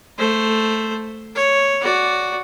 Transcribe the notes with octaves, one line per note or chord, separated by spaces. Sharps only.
A3 C5
C#5
F#4 D5